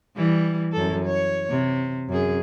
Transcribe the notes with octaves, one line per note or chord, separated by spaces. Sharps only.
E3 G3
F#2 A4
C#5
C3
F#2 G#4